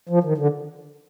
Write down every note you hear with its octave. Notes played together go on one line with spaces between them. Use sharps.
F3
D#3
D3